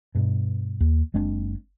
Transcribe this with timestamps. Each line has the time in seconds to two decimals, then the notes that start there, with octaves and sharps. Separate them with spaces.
0.15 G2 B2
0.81 D#2
1.14 F#1 G#3 C4 D4